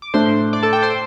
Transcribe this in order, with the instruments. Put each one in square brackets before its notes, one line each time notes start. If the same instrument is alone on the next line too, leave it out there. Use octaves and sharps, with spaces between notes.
[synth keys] D6
[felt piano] A2 A3 D4 [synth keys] C5 C6
[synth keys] D5 D6
A4 A5
G5
C5 C6